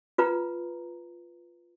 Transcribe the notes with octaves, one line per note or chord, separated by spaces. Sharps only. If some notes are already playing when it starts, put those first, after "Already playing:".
F4 B4 A#5